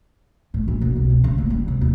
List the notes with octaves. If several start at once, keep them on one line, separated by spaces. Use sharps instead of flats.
A2
A#1
B2
C2
C4
C#3
A#3
G3
C3
D#2